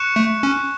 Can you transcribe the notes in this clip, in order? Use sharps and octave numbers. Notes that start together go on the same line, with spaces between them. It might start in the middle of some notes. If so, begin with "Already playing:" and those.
Already playing: C#6 F#6 C#7 E7
A3
C#4